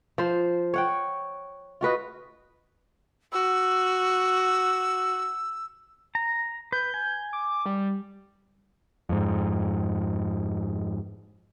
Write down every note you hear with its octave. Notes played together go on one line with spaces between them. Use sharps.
F3 C5
C#5 F#5 G5
F4 F#4 B4 D#5
F#4 E6
A#5
B4 G6
G#5
D6
G3
F2 G#2